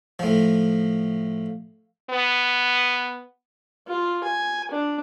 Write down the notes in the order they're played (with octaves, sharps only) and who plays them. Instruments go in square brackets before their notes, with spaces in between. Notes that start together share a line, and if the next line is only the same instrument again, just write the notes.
[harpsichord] A2 F3
[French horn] B3
[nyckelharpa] F4
G#5
D4